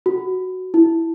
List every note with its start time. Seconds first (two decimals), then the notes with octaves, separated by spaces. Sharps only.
0.06 F#4
0.74 E4